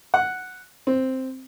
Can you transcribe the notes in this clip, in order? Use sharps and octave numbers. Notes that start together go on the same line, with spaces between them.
F#5
C4